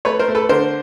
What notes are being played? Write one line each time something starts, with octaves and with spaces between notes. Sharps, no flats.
A3 B4 C#5
A#4 C5
A3
A4 B4
D3 A#4 C5